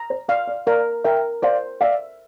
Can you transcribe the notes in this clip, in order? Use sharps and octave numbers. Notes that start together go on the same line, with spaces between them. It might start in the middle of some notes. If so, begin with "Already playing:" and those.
Already playing: A#5
C5
D5 F5
D5
A#4 D5 F5
A#4 E5 G5
C5 D5 F5
D5 E5 F5